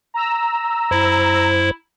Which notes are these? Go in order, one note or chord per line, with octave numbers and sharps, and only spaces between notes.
A#5 E6
F#2 E4 C5